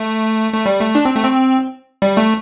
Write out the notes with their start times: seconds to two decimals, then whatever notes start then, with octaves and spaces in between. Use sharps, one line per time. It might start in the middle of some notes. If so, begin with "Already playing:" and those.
Already playing: A3
0.53 A3
0.66 G3
0.80 A3
0.95 D4
1.05 C4
1.16 A3
1.24 C4
2.02 G3
2.17 A3